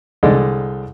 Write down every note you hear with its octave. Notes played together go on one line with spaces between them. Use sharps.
C2 D3 G#3 A4 D5 D#5